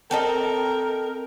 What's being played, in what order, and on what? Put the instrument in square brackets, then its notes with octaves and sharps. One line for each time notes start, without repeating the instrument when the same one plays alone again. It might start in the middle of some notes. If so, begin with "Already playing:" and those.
[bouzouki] C4 A4 D#5 [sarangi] A#4